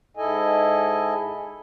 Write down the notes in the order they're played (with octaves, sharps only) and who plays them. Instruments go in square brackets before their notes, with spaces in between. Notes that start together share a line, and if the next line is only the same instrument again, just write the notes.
[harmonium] G#2 E4 A4 D#5 G#5